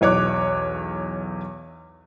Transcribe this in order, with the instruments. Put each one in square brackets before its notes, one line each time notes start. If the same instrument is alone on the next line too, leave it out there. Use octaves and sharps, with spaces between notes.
[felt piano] B1 E2 C#5 D6 F#6